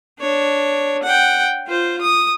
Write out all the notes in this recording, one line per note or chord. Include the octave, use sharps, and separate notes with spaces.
D4 C#5
F#5 G5
F4 C5
D#6